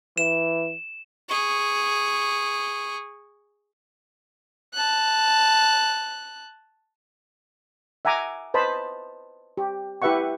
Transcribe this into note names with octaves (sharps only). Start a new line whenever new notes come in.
E3 E7
G#4 C#6
A5 F#6
E5 F#5 G#5 A#5 D6
B4 C5 D#5 A5 B5
G4
E4 G4 B4 E5 F#5 C#6